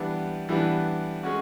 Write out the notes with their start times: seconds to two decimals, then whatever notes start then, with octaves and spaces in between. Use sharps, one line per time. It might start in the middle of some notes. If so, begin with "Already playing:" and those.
Already playing: E3 G3 B3 D4
0.49 E3 G3 B3 D4
1.23 G#3 C#4 F#4